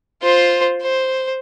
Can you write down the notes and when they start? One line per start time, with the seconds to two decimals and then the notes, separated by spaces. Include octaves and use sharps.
0.22 F4 C5
0.81 C5